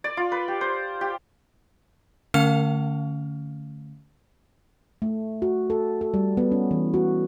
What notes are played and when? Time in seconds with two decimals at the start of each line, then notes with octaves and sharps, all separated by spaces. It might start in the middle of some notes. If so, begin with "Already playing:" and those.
0.04 D5
0.17 F4
0.32 B4
0.48 G4
0.61 C5
1.01 G4
2.34 D3 A3 C#4 F5 F6 F7
5.02 A3
5.42 F#4
5.70 A4
6.01 A4
6.14 G3
6.37 B3
6.52 C#4
6.71 E3
6.94 F#4